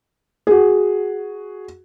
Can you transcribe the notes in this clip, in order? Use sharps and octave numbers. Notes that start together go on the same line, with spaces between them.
F#4 G#4